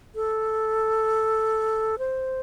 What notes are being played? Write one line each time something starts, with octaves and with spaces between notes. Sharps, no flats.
A4
C5